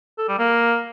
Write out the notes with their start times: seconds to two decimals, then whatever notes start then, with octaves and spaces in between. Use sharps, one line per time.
0.18 A4
0.28 G3
0.38 A#3